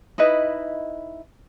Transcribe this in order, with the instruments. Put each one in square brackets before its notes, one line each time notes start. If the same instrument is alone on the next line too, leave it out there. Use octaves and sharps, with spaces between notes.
[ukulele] D#4 E4 B4 D#5